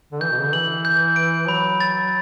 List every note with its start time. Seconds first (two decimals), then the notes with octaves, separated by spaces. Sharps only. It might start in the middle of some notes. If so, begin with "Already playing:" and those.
0.12 D3
0.21 E3 G6
0.32 B2
0.38 C#3
0.46 D3
0.53 E3 F#7
0.85 G6
1.16 D7
1.48 F#3 B5
1.80 A6